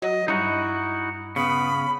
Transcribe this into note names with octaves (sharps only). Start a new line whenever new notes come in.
F#3 D#5
G2 D#4 E4 F#4
C#3 B3 B5